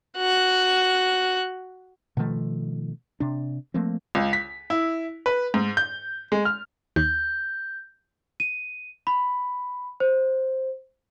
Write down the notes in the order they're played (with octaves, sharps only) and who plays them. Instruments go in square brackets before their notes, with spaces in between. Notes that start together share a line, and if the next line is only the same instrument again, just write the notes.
[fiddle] F#4 F#6
[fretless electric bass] B2 D#3 F3 A3
C3 D4
F3 A3 A#3 C4
[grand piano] C#2
B6
E4
B4
G#2
G6
G#3
F6
[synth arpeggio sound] D#2 [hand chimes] G6
[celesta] D#7
B5
C5